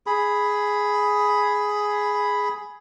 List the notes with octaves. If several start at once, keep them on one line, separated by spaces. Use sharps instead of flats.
G#4 B5